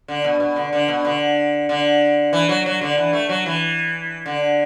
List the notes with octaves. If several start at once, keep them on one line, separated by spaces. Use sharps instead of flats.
D3
B2
B2
D3
D3
B2
D3
D3
E3
F#3
F#3
D3
E3
A3
F#3
E3
D3